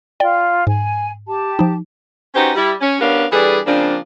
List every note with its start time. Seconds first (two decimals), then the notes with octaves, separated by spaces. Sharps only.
0.20 F4 D5 G5
0.67 G#2 G#5
1.28 G4 A5
1.59 F3 D#4
2.34 C#4 D#4 F#4 G4 B4 C5
2.55 G3 E4
2.80 C#4
2.99 G3 B3 C#4 D4 A#4 F5
3.31 E3 G3 D4 G#4 A4 B4
3.65 C#3 F3 A#3 C4 D4